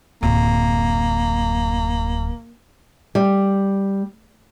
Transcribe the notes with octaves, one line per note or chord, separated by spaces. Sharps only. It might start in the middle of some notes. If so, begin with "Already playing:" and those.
D1 F#2 A#3
G3